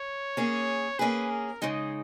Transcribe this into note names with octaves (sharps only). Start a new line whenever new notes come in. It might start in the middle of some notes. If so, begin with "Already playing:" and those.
Already playing: C#5
A#3 C#4 G#4
A#3 C#4 G#4 B4
A#4
C#3 G#3 D#4 G#4